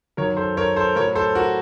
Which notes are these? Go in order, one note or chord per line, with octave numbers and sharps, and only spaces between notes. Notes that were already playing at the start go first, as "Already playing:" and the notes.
F#2 D#3 F#3 A#4 C#5
A4 C5
A#4 C#5
A4 C5
A2 F#3 A#4 C#5
A4 C5
F#4 A#4